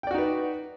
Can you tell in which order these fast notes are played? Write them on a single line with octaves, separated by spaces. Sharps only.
G5 D5 F#4 D#4 B4